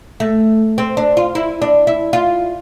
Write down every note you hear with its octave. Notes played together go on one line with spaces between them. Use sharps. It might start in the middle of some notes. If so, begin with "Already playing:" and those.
A3
C4
D4
F4
E4
D4
E4
F4